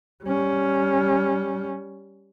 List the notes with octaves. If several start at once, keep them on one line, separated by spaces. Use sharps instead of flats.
G3 C#4